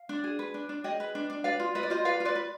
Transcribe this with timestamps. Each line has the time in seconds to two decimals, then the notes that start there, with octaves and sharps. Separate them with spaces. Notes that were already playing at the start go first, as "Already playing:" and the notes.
Already playing: F5
0.09 D4
0.24 G#4
0.39 B4
0.54 D4
0.69 D4
0.84 G#4 D#5 G5
1.00 B4
1.15 D4
1.30 D4
1.44 B4 D5 F5
1.60 F4
1.75 B4 D#5
1.83 D5
1.90 F4 C5 D#5
2.05 B4 D5 F5
2.20 F4
2.25 B4 D5
2.35 B4